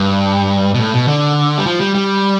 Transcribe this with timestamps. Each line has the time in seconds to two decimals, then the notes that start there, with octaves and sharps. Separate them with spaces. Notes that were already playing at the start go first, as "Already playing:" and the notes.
Already playing: G2
0.74 B2
0.79 A2
0.94 B2
1.08 D3
1.58 G3
1.66 F3
1.80 G3
1.95 G3